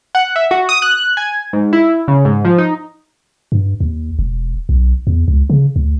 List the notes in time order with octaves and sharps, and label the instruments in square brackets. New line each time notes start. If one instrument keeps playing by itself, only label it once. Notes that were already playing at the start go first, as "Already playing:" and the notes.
[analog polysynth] F#5
E5
F#4
D#6
F#6
G#5
G#2
E4
C#3
G#2
F3
D#4
[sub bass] G2
D#2
E1
B1
E2
C#2
C#3
D2